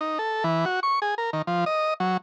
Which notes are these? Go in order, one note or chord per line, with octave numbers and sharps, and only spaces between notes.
D#4
A4
E3
F#4
C#6
G#4
A#4
D#3
F3
D#5
F#3